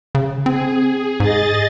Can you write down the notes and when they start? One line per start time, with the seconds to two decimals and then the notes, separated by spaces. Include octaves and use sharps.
0.15 C#3
0.46 C4 G#4
1.20 G#2 G#4 D#5 A6